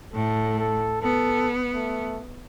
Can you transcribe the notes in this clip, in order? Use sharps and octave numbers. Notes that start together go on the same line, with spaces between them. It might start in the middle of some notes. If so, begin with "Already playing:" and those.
A2 A4
A4
B3 A4
A3